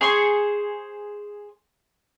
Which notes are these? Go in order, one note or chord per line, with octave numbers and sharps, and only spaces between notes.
G#4 C5 C#6